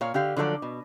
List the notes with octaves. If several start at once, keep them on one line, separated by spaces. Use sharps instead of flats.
A#2 C#5 F5
D3 G4 F5
D3 F3 F#3 A4 D5
B2